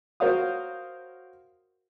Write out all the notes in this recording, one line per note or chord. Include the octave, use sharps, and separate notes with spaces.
F#4 A#4 C5 C#5 F5 D#6